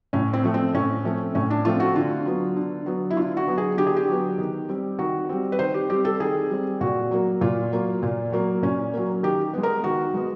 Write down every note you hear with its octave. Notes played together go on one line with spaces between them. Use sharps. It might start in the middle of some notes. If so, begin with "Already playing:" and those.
A2 C#4
C4
F3 A3 C4
C4
A2 C#4
F3 A3 C4
A2 C#4
D4
F3 A3 C4 F4
F#4
D3 F4
F#3 B3
D3
F#3 B3
E4
D3 F4
F#4
F#3 B3
G#4
D3 G4
G#4
G4
F#3 B3
D#3
G3 C4
D#3 F#4
G3 C4
B4
D#3 C5
G4
G3 C4 G4
A4
D#3 G#4
G3 C4
A#2 F#4
F#3 A#3
A#2 F4
F#3 A#3
A#2
F#3 A#3
A#2 C#4
F#3 A#3
D#3 G4
G#3 B3
A#4
D#3 F#4
G#3 B3